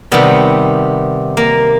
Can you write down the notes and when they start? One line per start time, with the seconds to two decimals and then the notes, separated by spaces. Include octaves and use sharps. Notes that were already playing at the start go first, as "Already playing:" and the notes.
0.11 C3 D#3 G3 B3
1.37 A#3